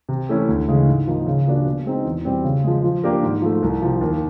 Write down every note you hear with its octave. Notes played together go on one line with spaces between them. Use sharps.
C3
E3 A3 C#4 E4
D2
C#3 E3 G#3
G#2
F3 A#3 D#4
C#3
F3 A#3 D4 F#4
B2
G#3 C4 D#4
E2
B2 G3 C4
C#3
F3 G#3
F3
A#3 D4 G4 A#4
G#2
F3 A3
C2
C3 F3
D#2